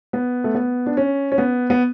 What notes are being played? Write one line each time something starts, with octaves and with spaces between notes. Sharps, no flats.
B3
A3
B3
D4
C#4
C#4
B3
B3